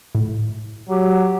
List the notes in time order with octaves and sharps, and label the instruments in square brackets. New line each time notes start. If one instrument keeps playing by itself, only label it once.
[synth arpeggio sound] A2
[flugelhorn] F#3 [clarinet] G4